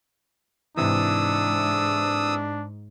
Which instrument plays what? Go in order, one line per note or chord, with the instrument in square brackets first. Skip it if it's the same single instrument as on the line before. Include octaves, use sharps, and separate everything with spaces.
[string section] G#2 [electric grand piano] C3 E3 [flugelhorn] D4 [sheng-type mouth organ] D#6 E6